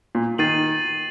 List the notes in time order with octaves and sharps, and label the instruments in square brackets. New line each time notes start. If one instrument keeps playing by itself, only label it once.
[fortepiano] A#2
[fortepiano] D#3 [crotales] A6 C7 D#7 F#7